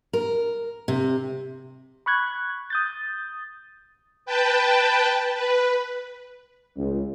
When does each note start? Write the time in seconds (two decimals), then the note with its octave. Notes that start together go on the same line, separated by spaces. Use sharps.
0.13 A#4
0.88 C3
2.06 B5 C#6 F#6 G#6
2.70 D#6 G6 A6
4.26 B4 G5 A5
5.34 B4
6.77 C#2